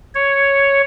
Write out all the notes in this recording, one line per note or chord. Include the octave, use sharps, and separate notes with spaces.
C#5